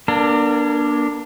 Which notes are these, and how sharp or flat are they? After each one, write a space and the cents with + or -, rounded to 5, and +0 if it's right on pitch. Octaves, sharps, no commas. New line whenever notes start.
A#3 +45 D4 +0 A#4 -35